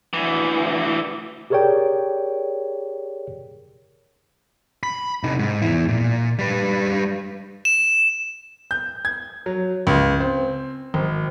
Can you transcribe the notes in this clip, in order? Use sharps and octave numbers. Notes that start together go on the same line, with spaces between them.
D2 E3
G4 G#4 A#4 C#5 D5 G5
B5
C3 D#4
G#2
E2 E4
A#2
G3 B4
E7
G6
G#6
F#3
C#2
C4
G#1